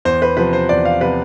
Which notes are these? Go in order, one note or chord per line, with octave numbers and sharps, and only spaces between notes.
E2 C5
B4
C3 F3 B3 B4
C5
E2 D5
F5
C3 F3 B3 B4